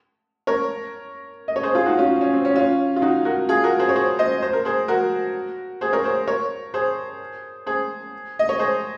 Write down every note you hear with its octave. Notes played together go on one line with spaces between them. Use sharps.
A#4 C#5
D#5
C#5
G#4 C5
F4 G#4
D#4 F#4
C#4 F4
C#4
C4
C#4
C#4 F4
F4
D#4 F#4
F#4 A#4
F4 G#4
F#4 A#4
G#4 C5
C#5
G#4 C5
C5 D#5
C5
A#4
G#4 C5
F#4 A#4
G#4 C5
A#4 C#5
G#4 C5
A#4 C#5
G#4 C5
G#4 C5
D#5
C#5
G#4 C5